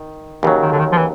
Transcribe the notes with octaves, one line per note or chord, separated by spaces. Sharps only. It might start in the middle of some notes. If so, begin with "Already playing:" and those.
Already playing: D#3
D#2 C#3 E3 F#3
D#3
D3
D#3
F3
E3